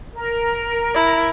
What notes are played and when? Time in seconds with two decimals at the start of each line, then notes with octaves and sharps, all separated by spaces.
0.14 A#4
0.94 E4